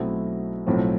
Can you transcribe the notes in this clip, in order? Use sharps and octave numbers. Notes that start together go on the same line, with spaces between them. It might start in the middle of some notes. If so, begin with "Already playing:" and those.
Already playing: B1 B2 A3 C4 E4
B1 A2 F3 C4